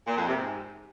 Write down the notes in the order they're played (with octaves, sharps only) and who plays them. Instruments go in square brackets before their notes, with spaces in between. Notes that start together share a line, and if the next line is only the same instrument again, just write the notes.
[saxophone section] A#2
F2
C3
G#2